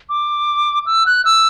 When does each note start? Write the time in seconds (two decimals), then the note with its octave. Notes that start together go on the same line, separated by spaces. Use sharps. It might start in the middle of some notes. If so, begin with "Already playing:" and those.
0.09 D6
0.86 E6
1.06 F#6
1.25 E6